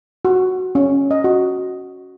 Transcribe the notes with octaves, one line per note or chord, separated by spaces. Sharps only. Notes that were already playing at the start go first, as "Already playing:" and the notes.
F#4
C#4
D#5
F#4